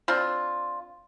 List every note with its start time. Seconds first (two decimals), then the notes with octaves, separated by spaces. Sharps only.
0.08 C4 D4 F4